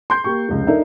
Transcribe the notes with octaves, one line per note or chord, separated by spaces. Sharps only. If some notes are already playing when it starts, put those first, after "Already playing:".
C6 G6 C7
A#3 G4 C#6
F1 C#2
D4 D#4 A4 A#4 E5